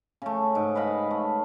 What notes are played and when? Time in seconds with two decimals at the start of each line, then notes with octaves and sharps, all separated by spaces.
0.22 C#3 A3
0.55 G#2
0.75 B4 D#5 F5 B5
1.11 A3